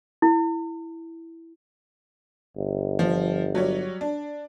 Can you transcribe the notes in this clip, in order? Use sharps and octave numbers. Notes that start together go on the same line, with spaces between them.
E4
G1
F3
F#3 G3 C#5
D4